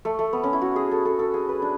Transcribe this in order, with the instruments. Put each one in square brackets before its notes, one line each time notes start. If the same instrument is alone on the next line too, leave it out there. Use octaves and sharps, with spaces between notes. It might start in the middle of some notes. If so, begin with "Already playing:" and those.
[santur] A3
A3
B3
C#4
E4
F#4
G#4
A4
A4
A4
G#4
B4
D4